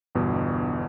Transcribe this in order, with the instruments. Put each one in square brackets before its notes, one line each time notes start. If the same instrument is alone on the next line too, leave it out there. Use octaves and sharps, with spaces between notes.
[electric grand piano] G1 E2 G2 B2